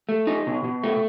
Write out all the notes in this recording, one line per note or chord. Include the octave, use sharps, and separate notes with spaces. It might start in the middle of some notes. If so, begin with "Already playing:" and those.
A3
D#4
B2
B2
A3